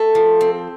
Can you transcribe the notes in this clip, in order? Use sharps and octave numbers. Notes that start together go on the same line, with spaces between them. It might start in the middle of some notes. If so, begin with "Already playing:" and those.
Already playing: A3 A4
F3
C4